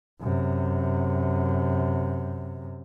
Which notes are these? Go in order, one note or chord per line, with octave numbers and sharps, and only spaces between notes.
F#2 C3